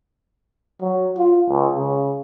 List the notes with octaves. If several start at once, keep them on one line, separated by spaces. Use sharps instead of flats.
F#3
F4
C#2
C#3